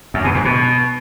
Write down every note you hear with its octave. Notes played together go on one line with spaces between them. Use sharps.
F#2
B2
G#2
B2